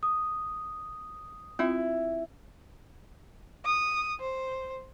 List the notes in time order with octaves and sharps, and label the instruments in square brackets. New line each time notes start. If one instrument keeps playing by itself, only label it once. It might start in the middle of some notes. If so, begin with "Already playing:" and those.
[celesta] D#6
[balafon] C4 F4 [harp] E4
[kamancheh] D#6
C5